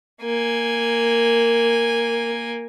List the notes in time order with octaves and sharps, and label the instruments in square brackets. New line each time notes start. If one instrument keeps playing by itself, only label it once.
[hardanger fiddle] A#3 G#5